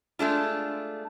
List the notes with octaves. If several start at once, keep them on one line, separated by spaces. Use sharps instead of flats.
G#3 A3 D4 F4